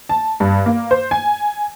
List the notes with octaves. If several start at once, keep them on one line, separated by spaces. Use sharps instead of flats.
A5
G2
A#3
C5
G#5